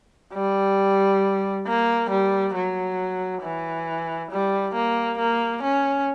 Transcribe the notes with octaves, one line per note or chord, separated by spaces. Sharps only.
G3
A#3
G3
F#3
E3
G3
A#3
A#3
C#4